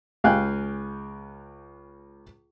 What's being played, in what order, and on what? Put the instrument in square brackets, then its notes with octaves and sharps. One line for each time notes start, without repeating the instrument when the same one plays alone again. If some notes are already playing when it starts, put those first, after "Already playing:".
[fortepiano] C#2 F5 G5 G#5 F#6